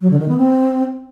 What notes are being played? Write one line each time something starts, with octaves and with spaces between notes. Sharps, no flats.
F#3
D3
D#3
B3
C4